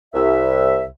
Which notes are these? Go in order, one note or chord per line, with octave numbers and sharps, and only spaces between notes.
C2 E5